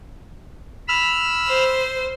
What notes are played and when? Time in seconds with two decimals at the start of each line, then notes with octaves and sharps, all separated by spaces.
0.88 B5 E6 F6
1.48 C5